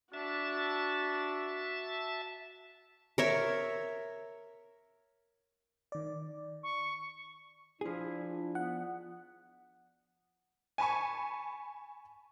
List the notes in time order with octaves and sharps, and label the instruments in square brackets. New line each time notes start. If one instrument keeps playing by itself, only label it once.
[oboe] D4 [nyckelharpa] F#4 [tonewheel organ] E5 A5
[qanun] A#4 C#5 E5
[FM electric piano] D#3 D5
[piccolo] C#6
[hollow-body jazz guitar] F3 G#4 [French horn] D4 [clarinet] E4
[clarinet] B3 [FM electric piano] F#5
[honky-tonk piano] G#5 A5 B5 C#6